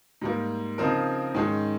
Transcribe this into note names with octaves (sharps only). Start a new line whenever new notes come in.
G#2 G3 A#3
C#3 F3 C4 D#4 A#4
G#2 D#3 G#3 C#4